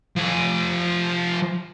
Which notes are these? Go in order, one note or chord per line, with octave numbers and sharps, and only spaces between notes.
F3 G#5